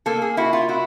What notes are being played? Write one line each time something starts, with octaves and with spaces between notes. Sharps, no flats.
A#3 A4
G#4
E4 F#4
F4
E4 F#4